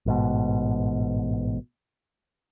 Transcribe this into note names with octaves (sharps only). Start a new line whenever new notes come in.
A1 G#2 B2